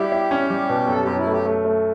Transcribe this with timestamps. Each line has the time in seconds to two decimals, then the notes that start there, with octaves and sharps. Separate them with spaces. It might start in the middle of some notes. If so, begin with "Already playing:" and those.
Already playing: G3 E4 F#4 G4
0.12 E4
0.31 C#4
0.50 G3
0.69 B2
0.88 F#2 A4
1.02 F#2 G4
1.17 E4
1.27 A3 G4
1.45 A3
1.65 A3